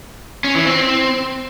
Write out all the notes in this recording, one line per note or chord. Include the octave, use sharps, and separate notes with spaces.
C#4
E3
C4